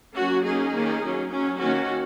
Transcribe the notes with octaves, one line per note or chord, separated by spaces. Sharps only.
F#3 A#3 C#4 F#4
F#3 A#3 C#4 D#4 G#4
D#3 A#3 C#4
F#3 A#3 C#4
F#3 C#4
D#3 A#3 C#4 F#4